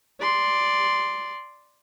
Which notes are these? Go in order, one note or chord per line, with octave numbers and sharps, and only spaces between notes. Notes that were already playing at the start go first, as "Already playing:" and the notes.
D5 C6